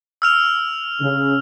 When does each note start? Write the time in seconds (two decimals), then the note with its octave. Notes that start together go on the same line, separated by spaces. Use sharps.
0.22 E6 F6 F7
1.01 C#3